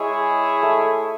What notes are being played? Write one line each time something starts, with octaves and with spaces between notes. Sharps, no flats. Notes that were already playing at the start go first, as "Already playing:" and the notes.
Already playing: G#3 E4 G#4 C#5
A3